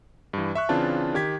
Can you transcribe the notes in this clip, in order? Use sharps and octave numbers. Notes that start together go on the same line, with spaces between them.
G2 E3
E5 C#6 F#6
C#3 E3 C4 D4 F4 A5
D#3 G4 G#6 B6